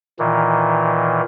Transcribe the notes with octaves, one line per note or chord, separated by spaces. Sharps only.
A#2 D#3 E3